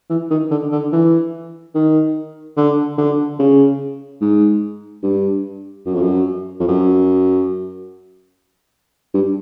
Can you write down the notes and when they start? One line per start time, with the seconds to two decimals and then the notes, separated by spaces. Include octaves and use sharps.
0.10 E3
0.31 D#3
0.51 D3
0.72 D3
0.92 E3
1.75 D#3
2.57 D3
2.98 D3
3.39 C#3
4.21 G#2
5.03 G2
5.86 F#2
5.94 F2
6.02 F#2
6.60 F2
6.68 F#2
9.14 G2